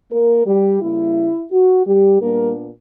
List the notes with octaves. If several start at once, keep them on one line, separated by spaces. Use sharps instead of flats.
A#3 A#4
G3 G4
C#3 G3 A#3 E4
F#4
G3 G4
A#2 G3 A#3 B3 D4 A#4